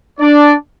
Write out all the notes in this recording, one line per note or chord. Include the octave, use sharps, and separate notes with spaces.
D4 D5